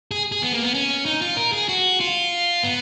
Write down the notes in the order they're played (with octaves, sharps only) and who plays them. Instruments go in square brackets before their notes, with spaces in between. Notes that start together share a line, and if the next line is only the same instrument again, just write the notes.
[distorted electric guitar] G#4
G#4
B3
A#3
B3
C#4
D#4
F4
A#4
G#4
F#4
F4
B3